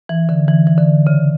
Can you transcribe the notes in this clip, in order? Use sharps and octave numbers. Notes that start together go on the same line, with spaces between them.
E3
D3
E3
E3
D3
C#3